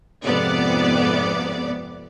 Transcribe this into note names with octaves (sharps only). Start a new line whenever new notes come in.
F2 G#2 C3 B3 D5